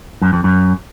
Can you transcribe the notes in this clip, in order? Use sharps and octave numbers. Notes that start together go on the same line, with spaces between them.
F#2
F2
F#2